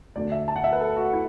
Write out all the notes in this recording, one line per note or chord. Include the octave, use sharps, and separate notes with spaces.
D2 D3 A3 D4 D5
E5
A5
F#5
E5
B4
A4
F#4
E4